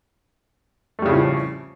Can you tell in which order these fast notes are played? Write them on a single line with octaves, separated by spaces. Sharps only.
A3 G3 C#3 A2 F3